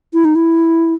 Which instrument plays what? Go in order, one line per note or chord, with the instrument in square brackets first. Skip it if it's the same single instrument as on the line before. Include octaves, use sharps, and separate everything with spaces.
[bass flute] E4
D#4
E4